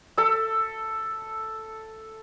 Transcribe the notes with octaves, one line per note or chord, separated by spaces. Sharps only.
A4 E5